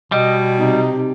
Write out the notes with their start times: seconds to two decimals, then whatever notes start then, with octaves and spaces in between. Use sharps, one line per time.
0.12 B2 G3 D#5
0.59 C3 D#4